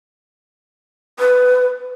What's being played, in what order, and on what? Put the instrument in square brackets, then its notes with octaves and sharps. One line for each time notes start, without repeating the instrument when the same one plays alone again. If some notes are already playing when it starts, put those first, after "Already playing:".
[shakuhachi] B4